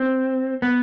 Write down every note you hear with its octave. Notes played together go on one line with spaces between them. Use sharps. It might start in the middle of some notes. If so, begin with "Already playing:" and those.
Already playing: C4
B3